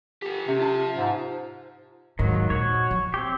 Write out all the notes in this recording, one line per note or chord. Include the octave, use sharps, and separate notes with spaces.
G4 A4
C3 C#4
F4 A5
G#2
D#2 G#2 D#3 F3 F#3
A#2 F#4 C#5
F3
C4 G4